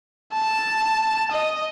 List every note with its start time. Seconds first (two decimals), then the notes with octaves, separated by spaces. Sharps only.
0.34 A5
1.32 D#5